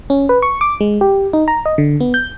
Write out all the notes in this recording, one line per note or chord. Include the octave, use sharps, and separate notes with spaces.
C#4
B4
C#6
D6
G#3
G4
D#4
A#5
D#5
D3
B3
G6